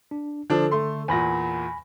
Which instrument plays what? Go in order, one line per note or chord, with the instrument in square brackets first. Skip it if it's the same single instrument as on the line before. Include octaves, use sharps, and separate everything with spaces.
[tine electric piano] D4
[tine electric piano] D3 A4 [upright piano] F3 D4
[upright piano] A3 C6
[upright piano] E2 A#2 [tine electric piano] G#5 B5 A#6